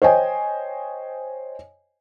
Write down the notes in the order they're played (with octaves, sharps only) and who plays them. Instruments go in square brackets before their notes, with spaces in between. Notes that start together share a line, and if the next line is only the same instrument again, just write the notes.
[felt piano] C5 C#5 D#5 G5 G#5